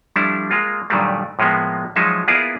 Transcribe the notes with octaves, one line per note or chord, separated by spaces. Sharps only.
F3 G3 A3 D4 E4
G#3 A#3 F4
G2 A#2 D#3 F#3 G3 A3
A2 F3 G#3 A#3 B3
F3 F#3 G#3 D#4 E5
A#3 B3 E4 F4 G#4 D5